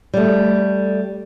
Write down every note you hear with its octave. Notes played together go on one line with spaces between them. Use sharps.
G3 A3